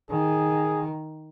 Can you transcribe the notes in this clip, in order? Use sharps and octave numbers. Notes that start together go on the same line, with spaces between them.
D#3 G#4